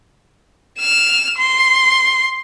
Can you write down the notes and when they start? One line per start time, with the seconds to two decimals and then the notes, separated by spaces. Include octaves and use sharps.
0.79 F6 E7
1.38 C6